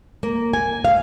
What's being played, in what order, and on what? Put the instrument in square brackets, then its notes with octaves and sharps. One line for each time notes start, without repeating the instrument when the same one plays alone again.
[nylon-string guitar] A#3
G#5
F5